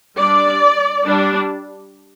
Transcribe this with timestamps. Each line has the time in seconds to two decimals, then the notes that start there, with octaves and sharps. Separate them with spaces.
0.18 G3 D4 D5
1.05 G3 D4